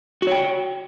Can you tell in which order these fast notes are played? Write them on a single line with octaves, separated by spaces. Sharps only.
F#4 C#5 G5